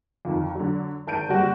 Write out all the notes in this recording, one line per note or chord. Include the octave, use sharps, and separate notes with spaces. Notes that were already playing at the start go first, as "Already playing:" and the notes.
F2 D#3
D3 F#3
G#1 A5 G6 D7 D#7
F#1 G3 F#4